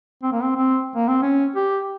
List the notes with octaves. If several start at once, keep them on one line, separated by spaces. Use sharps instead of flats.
C4
A#3
C4
C4
A#3
C4
C#4
G4